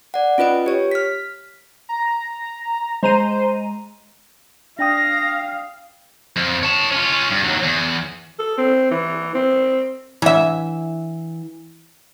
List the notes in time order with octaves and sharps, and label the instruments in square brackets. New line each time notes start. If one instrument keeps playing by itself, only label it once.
[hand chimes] D5 F#5
C#4 F4 B4 D#5 D7
G4 C#5
F6 B6
[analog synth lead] A#5
[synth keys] G#3 A#5 D#7 [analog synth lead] C5
[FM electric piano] D4 G5 D#6 [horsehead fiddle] F5 [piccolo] A#6
[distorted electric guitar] F2
C#5 A5
C#4 F4
G2
D#2 F#3
E2
[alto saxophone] A4
C4
E3
C4
[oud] E3 E5